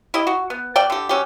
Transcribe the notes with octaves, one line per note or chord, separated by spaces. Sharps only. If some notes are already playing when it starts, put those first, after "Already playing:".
E4 G4 D#5
F#4
B3
B2 D5 G5
D3 G4
F#3 C#4 G4